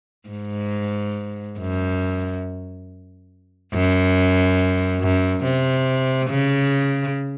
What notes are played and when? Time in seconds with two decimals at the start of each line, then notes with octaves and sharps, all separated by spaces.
0.29 G#2
1.59 F#2
3.73 F#2
5.01 F#2
5.44 C3
6.30 C#3